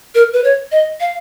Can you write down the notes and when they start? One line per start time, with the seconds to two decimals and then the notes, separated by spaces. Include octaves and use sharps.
0.15 A#4
0.33 B4
0.44 C#5
0.72 D#5
1.00 F5